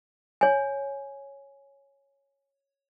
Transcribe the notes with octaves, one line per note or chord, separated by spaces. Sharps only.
C#5 G#5